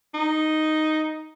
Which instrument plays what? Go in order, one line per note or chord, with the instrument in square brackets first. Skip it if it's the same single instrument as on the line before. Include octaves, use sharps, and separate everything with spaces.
[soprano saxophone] D#4